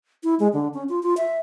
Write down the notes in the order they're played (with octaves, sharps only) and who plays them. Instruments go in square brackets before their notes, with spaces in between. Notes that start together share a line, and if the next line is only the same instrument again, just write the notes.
[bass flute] E4
G#3
D3
C#4
F4
F4
E5